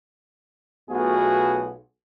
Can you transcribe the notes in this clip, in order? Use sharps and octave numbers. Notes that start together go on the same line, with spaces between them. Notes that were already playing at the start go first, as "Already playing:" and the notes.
B1 B2 A3 F4 F#4 G#4